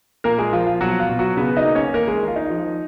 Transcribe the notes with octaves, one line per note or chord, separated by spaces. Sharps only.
A#2 A#3 A#4
G#3 G#4
F3 F4
F4
B2 F#3 F#4
F4
B2
F#3 F#4
C#3 B3 B4
D#4 D#5
A#3
C#4 C#5
D#3 A#3 A#4
G#3 G#4
D#3
F4
D#4
F3